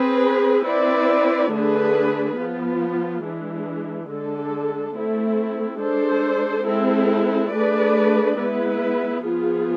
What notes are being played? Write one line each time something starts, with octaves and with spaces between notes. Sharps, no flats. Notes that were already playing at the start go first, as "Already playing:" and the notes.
Already playing: C4 G#4 B4
C4 E4 B4 D5
D3 A3 D4 G#4 B4
F3 B3 F4
E3 G#3 D4
D3 G#3 D4 A4
A3 C4 E4
G#3 D4 A4 C5
G#3 C4 E4 A4
A3 D4 G#4 B4 D5
G#3 B3 E4 B4
F3 B3 F4 G#4